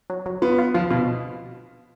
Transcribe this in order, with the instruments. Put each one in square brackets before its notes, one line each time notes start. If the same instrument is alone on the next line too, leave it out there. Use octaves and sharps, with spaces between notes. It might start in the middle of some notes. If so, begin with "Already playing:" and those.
[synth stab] F#3
F#3
[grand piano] B3 [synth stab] F4
[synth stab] F4
[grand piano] F3 [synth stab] F4
[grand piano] B2 [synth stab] F4